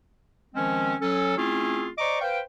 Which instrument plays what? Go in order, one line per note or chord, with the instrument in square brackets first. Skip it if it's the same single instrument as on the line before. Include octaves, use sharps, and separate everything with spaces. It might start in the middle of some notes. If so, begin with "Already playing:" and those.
[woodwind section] D#3 F3 G#3 C4 C#4
F#3 C#4 A4
A3 C4 C#4 E4 F4 G#4
C5 D5 D#5 A#5 C#6 D6
B4 C5 F5 G5